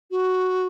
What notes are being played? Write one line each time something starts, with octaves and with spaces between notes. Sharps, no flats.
F#4